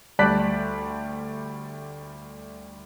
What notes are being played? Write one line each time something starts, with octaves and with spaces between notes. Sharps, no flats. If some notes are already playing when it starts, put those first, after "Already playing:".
D2 G3 D5 A5 F#6 B6